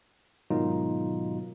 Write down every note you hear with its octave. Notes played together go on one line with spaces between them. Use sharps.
G#2 B2 D#3 F#3 D#4 F4